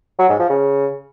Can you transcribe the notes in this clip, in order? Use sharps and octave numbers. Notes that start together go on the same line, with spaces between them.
F#3
G#2
F3
C#3